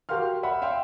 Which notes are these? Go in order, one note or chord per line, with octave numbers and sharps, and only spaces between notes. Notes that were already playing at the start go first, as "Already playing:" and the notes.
F#4 G4 A#4 F5 C6 F6
E5 F#5 B5
E5 F5 G5 C6